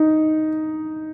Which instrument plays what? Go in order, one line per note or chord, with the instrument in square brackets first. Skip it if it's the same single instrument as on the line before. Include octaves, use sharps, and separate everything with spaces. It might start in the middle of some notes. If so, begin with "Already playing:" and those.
Already playing: [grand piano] D#4